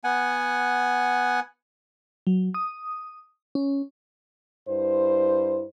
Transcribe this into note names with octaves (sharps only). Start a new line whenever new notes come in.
B3 F#5 G#5
F#3
D#6
C#4
G2 E4 C5